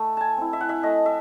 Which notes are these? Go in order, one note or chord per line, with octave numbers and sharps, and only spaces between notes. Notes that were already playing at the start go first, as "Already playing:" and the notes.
Already playing: A3
G#5 A5
C4 E4
E5
F#5
E5
A3 D#5
E5